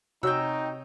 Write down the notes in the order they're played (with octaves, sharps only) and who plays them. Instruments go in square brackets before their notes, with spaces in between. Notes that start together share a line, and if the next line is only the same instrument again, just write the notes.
[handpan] C3 C#5 [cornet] D#4 [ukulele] F#4 G#5 [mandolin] G5 E6